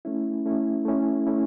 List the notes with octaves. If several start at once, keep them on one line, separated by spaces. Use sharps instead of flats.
A3 C#4 E4
A3 C#4 E4
A3 C#4 E4
A3 C#4 E4